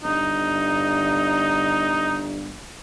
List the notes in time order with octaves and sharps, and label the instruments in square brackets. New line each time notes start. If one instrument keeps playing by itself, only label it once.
[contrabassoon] G1 [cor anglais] D#4